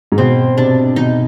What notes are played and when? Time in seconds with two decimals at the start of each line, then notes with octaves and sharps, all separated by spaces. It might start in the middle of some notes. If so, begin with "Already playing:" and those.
0.12 G#2
0.18 B2 C4
0.57 C3 D4
0.96 B2 D#4